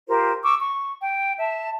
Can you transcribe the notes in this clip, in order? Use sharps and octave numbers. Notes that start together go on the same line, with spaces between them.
F4 G4 A#4 C5
C#6 D6 E6
C#6
G5
E5 A5